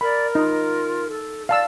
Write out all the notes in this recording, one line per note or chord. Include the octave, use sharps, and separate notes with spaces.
A#4 D5 B5
D#4 F4
A4
D5 F5 A5 E6